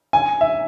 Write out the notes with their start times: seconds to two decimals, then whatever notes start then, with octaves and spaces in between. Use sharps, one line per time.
0.13 G#5
0.41 E5